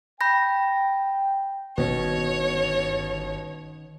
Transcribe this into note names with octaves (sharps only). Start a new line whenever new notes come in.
G5 B5 G6 A#6
G1 B2 D#3 C4 C#4 C#5